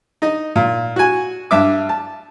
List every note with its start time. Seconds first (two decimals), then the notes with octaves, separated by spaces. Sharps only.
0.22 D#4 D#5
0.56 A#2
0.96 F#4 G#5
1.51 G2 E5 D6
1.89 A5